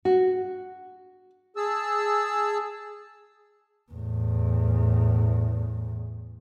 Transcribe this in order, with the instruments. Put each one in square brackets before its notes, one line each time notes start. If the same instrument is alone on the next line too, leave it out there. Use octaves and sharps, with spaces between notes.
[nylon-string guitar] F#4
[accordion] G#4 A5 E6
[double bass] E2 A2